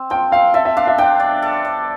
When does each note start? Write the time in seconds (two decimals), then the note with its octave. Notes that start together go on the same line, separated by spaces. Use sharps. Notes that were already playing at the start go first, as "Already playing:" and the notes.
Already playing: C4
0.10 F3 G5
0.32 C4 F5
0.54 A4 E5
0.65 E5
0.77 D4 F5
0.87 E5
0.98 D4 G5
1.20 D5
1.43 A4
1.65 D5